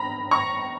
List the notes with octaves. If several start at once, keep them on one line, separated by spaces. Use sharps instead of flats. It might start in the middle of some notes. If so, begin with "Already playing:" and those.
Already playing: A#5 B5
A#5 C#6